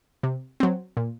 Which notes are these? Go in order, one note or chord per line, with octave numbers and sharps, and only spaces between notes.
C3
F#3 C4
A#2